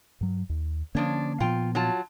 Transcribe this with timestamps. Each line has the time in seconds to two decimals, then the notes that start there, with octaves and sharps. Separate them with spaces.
0.21 G2 F#3
0.49 D#2
0.95 D3 F3 A#3 C#4 D4 C#5
1.40 A#2 F3 B3 F4 G5
1.75 F#3 F4 A5